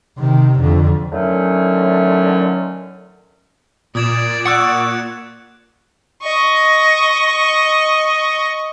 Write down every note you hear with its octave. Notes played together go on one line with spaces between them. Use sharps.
C3 D#3
F2 D3
A2 D3 D#3 F#3 A3 C#4
A#2 D5 D#6 G#6 E7
F#5 C#6 E6 F#6 C#7
D#5 C#6